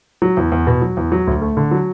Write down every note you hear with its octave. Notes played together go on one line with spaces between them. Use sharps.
F#3
E2
E2
B2
F#3
E2
F#3
D2
A3
D3
F#3